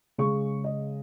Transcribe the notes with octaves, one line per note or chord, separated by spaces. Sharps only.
C#3 G#3 C#6
D#5